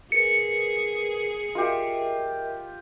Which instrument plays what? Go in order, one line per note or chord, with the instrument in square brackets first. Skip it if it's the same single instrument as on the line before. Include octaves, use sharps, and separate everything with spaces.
[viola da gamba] G#4 [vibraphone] A#4 B4 [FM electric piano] C#7
[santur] F4 G4 [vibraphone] A#4 D#5 E5